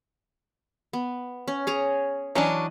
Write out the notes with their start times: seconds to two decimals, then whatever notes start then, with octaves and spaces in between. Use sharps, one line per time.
0.93 B3
1.48 C#4
1.67 G#4 C#5 A#5
2.35 E3 F#3 C#4 D4 B4 D#5